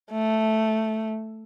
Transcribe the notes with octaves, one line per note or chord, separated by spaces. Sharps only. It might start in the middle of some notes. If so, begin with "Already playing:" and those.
A3